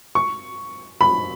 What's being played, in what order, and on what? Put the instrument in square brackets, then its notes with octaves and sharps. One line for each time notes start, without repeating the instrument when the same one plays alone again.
[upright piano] C#6
B5